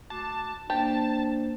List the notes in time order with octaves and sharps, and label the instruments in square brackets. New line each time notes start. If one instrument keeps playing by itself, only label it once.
[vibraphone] A3 F#4 D6 [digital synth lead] A5
[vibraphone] A#3 C5 [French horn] D4 [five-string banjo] G4 [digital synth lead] A5